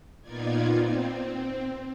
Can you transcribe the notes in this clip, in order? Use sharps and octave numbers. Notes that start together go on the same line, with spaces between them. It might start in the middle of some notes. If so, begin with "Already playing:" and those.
A#2 B3 D#4 F4 D5 G#6
C4